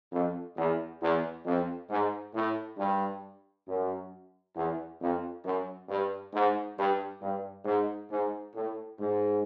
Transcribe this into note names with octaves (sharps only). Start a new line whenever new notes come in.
F2
E2
E2
F2
G#2
A2
G2
F#2
E2
F2
F#2
G2
G#2
G2
G2
G#2
G#2
A2
G#2